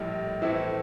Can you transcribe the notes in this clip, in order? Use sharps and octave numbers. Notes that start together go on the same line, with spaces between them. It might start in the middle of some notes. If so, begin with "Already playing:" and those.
Already playing: A#1 A2 G3
A2 E3 A3 C4 E4